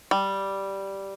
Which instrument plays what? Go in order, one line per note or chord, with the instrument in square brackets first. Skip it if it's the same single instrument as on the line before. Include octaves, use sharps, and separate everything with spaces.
[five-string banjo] G3